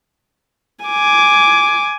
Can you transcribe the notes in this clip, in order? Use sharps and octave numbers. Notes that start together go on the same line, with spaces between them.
G#5 D6